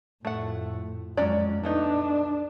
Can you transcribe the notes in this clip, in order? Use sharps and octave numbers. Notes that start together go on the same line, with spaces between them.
F2 A2 A3 F#5
F2 F#3 G#3 C#4 D5
A3 B3 D4 D#4